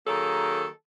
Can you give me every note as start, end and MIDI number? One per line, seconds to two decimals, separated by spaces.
0.06 0.65 51
0.06 0.65 54
0.06 0.65 58
0.06 0.65 68
0.06 0.65 69